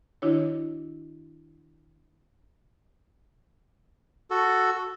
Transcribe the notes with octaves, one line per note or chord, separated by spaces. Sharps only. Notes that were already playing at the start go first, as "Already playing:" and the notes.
D#3 D4 E4 F#4 C#5
F#4 A4